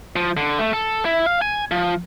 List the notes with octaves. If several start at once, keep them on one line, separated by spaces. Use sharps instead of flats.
F3
D3
A3
A4
E4
F5
G#5
F3